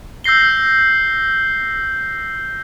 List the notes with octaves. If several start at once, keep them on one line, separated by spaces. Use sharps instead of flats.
E6 G6 A#6 C7 G7